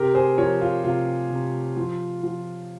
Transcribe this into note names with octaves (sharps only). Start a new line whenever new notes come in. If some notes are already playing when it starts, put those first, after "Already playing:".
Already playing: C3 G4 A#4
G#4 C5
F3 A#4 C#5
F4
C3 F4
C3
F3
F3